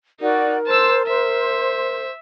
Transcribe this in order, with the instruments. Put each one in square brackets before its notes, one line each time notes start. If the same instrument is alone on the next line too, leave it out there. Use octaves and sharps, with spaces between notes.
[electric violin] D#4 [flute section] F#4 D5 [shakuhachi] A#4
[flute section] C5 [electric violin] A5 E6
[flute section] C5 [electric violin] E5